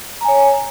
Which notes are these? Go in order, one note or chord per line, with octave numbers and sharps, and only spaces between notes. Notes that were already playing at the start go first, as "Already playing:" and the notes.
C#5 G#5 A#5